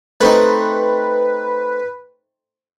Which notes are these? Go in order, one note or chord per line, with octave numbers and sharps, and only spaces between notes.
A3 C4 D#4 B4